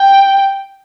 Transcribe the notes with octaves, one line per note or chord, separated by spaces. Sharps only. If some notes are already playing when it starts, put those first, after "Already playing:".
Already playing: G5